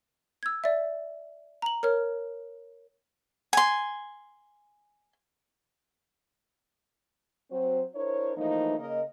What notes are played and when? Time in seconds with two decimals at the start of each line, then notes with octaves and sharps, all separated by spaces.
0.43 E6 G#6
0.64 D5 E5
1.62 A#5 F#7
1.83 A#4 C#5 F6
3.53 G#5 C6
7.51 F#3 C4 F#4 C5
7.95 D4 E4 A#4 C5 C#5
8.37 E3 F3 A3 A#3 D#4
8.79 C#3 A#3 A#4 D#5